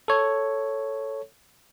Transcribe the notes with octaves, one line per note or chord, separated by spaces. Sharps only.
A4 C#5